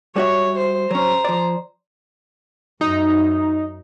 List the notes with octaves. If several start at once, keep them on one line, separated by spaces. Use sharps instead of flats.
G3 F#4 C#5 E5
C5
F#3 C#4 C5 A#5
F3 D5
F#2 D#4